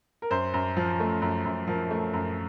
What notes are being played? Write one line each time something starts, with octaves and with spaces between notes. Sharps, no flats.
A#4
F#2 C5
F#2
F3
A3
F#2
F#2
F3 A#4
A3
F#2